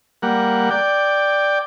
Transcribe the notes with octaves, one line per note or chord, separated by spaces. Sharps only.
G3 A#3 F#5
D5 G5